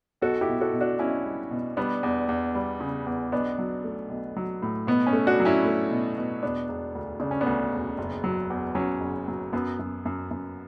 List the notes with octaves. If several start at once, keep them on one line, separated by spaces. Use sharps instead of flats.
B1 F#4 A4
E4 G4
B2
F#4 A4
B2
D4 F#4
B1 C#4 E4
G3
B2
G3 B3 D4
E2
E2
G3
C#3
E2
B1 B3 D4
F#3
A3
B1
F#3
A2
B2 B3
C#4
A3
D4 F#4
F#3
C#4 E4
A3
B2
B2
E1 B3 D4
E1
D2
C#3 D4
C#4
B3 D4
D2
E1
F#1
F#3
E2
F#3 C#4
F#1
F#3
F#2 B3
F#2
F#2
F#2